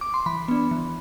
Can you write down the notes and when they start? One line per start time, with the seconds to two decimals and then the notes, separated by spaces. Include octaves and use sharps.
0.01 D6
0.14 C6
0.26 E3 B5
0.48 B3 D4
0.71 E3